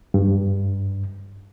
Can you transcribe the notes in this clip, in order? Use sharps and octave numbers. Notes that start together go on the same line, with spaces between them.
G2